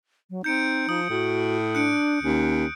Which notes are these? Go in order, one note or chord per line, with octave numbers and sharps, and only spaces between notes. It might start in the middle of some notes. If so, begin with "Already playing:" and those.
F#3
C4 D#4 G6 C#7 D7
F3 D#6
A2 F#4
D4 F#6 C#7 D7
D#2 C#4